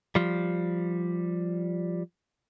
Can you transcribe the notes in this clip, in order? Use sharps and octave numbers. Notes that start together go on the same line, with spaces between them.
F3 G3